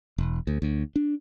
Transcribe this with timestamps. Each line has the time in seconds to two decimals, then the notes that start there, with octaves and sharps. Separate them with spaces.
0.18 E1
0.47 D2
0.62 D2
0.96 D4